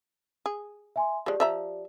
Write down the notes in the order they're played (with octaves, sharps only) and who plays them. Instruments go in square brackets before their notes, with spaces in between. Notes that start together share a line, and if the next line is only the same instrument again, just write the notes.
[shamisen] G#4
[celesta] E5 G#5 C6
[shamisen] F3 G#3 [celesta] G4 D5
[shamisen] F3 E5 A#5